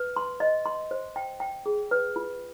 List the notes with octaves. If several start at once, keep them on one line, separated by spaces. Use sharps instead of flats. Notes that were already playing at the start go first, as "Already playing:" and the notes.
Already playing: B4
C6
D#5
C6
C5
G5
G5
G#4
B4
F4